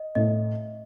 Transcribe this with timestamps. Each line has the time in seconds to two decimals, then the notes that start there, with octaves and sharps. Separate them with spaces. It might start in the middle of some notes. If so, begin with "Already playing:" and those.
Already playing: D#5
0.15 A2 D#5